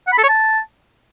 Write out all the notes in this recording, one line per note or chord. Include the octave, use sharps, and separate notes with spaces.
F#5
B5
A4
C#5
A5